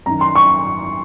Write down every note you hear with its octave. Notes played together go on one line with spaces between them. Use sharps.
F#2 D#3 A#5
C6
C#6